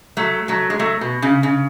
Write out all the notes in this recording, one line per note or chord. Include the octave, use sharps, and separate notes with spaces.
F#3 A3
F#3 A3
G#3
F#3 A3
B2
C#3
C#3